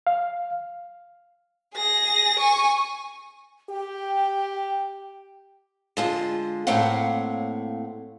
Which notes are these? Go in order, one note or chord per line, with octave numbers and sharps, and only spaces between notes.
F5
G#4 A#6
G#5 C#6
G4 G5
D3 G#3 F4
A2 A#3 C4 C#5 F5 F#5